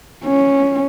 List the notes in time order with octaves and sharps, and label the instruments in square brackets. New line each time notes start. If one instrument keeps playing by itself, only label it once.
[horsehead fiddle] C#4